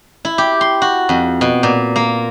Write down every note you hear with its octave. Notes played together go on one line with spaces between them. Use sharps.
E4
G4
C6
F#4
F2
B2
A#2
A#3